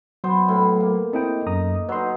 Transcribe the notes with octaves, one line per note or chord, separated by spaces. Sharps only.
F#3 B3 C5
A2 B5
A#3
C4 D#4 E4 G5
F#2 A#5 D#6
F#3 D#4 B4 C6